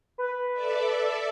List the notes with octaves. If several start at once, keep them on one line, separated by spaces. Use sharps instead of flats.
B4
A4 D5 E5